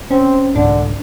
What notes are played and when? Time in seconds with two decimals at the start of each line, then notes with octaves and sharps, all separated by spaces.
0.11 C4 C#4
0.56 C2 G#2 D3 D4